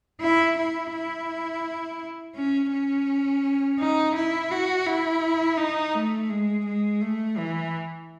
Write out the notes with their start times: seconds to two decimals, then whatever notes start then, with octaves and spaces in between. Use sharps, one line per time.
0.21 E4
0.57 E4
0.93 E4
2.36 C#4
2.72 C#4
3.79 D#4
4.15 E4
4.51 F#4
4.86 E4
5.58 D#4
5.94 A3
6.29 G#3
6.66 G#3
7.01 A3
7.37 E3